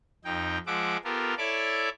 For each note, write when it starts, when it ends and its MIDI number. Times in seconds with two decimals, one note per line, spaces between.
0.24 0.58 41
0.24 0.58 63
0.24 0.58 79
0.66 0.97 53
0.66 0.97 56
0.66 0.97 76
0.66 0.97 78
0.66 0.97 86
1.04 1.34 59
1.04 1.34 65
1.04 1.34 67
1.04 1.34 69
1.04 1.34 70
1.38 1.89 64
1.38 1.89 69
1.38 1.89 73
1.38 1.89 74
1.38 1.89 76
1.38 1.89 86